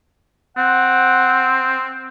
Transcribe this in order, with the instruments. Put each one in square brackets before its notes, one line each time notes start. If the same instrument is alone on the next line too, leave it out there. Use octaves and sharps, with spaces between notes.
[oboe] C4 [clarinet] F#5